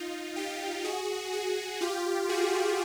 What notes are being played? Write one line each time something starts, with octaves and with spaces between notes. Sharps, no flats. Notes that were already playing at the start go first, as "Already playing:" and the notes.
Already playing: D#4 F4
F4 G4
F#4 G#4
F#4 G#4
F4 G4
F#4 G#4